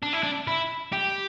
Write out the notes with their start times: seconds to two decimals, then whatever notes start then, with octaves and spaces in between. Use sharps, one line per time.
0.03 D4
0.13 E4
0.23 D4
0.47 E4
0.93 G4